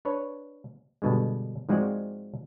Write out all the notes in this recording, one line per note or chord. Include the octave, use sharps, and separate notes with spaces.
D4 B4 C#5
G2 B2 D3 G#3
G#2 F3 G#3 C4 F#4 D5